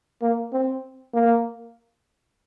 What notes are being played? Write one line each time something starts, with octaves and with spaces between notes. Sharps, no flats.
A#3
C4
A#3